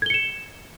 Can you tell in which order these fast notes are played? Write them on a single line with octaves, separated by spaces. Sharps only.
G#6 G7 C#7 E7